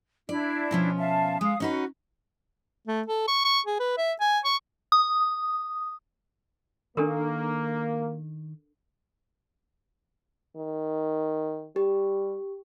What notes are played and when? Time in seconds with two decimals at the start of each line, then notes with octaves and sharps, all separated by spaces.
0.29 D4 E4 D5
0.71 B2 F3 C#4
0.98 E5 F5 A5
1.41 G#3 F5 D#6
1.60 C#4 D#4 F#4 B4
2.87 A3
3.08 A4
3.28 C#6
3.45 C#6
3.66 G#4
3.80 B4
3.98 E5
4.21 G#5
4.44 C#6
4.92 D#6
6.97 D#3 A#3 D4 A4 A#4
10.56 D#3
11.76 G3 G4